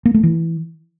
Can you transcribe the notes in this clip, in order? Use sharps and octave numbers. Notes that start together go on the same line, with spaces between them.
A#3
A3
E3